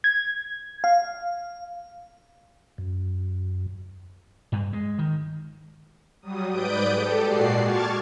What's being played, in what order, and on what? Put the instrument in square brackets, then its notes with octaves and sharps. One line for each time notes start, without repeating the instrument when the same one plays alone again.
[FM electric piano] G#6
F5
[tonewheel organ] F#2
[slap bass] G2
G#3
D#3
[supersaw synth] F#3 G3 D#6
G#2 B4 D5 D#6 G6 D7
G4 A4
A#2 G#3 F#4 D5 C7
A5 C#6 D6 F6 G#6 A6